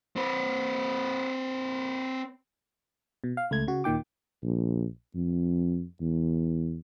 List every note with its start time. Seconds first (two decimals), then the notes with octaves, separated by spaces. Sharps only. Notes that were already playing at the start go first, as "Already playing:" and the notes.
0.16 C4 B4
3.24 B2
3.37 F5
3.51 C#2 A3 G#6
3.67 C#3 F#4
3.84 D#2 A#2 D#3 G5 D6
4.43 A#1
5.15 F2
6.01 E2